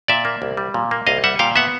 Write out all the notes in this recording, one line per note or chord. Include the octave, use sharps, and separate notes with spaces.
A#2 D5 E5
A#3
C2
G3
A#2
A#3
C2 D#5 F5
G3 E5 F#5
A#2 F5 G5
B3 E5 F#5